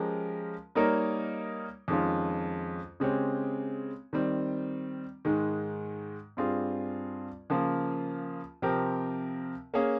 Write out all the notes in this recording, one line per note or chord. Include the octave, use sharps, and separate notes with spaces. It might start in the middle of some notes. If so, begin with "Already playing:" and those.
Already playing: F3 G#3 C#4 G4 A#4
G3 A#3 D#4 A#4 C#5
F2 D#3 G#3 C#4 F4
C#3 G#3 C4 G4 C#5
D#3 G3 C4
G#2 D#3 G#3
G2 G3 C4 F4 G#4
C#3 F3 A#3 F4
C3 F3 C4 G4 A#4
A#3 C#4 G#4 C#5 F5